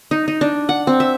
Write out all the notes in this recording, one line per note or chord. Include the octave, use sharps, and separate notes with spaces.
D#4
D#4
D4
F#5
C4
E5